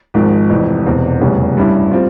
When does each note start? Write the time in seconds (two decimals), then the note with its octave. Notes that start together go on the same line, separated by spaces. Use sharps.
0.14 G#1 G#2 F3 G#3
0.50 F1 F2 E3
0.86 E1 E2 C3
1.21 F1 E2 C#3 G3 C#4
1.57 G2 G3 C#4 E4
1.91 G3 C4 F4